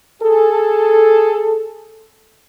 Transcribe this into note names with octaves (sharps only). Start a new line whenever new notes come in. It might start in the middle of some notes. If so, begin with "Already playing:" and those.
G#4 A4